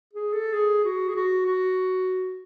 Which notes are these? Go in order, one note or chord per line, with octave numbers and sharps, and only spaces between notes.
G#4
A4
G#4
F#4
G#4
F#4
F#4